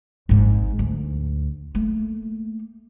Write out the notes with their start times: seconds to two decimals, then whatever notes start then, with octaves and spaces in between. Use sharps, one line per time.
0.29 G#1 G#2
0.79 D2
1.75 A3 A#3